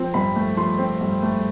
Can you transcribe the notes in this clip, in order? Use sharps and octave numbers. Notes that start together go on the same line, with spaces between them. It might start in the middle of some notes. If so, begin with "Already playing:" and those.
Already playing: F3 C4
G2 B5
A3
F3 C6
C4
G2
A3